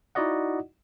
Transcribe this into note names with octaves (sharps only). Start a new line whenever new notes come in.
D#4 E4 F#4 D5 D#5 F#5